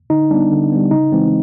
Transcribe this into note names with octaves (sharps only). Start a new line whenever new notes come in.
D3 D#4
G3 B3 D4
D3
G3 B3
C#3 D#4
E3 G#3 C4